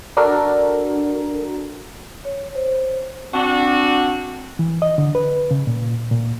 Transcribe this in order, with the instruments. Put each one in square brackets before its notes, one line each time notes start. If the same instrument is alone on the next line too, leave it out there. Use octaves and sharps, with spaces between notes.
[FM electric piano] D4 F#4 A4 A#4
[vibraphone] C#5
C5
[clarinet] C4 [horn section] D4 F#4
[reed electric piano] E3
D#5
D3
B4
C#3
A#2
A#2